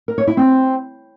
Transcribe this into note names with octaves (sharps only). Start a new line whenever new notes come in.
A#4
C#5
E4
C4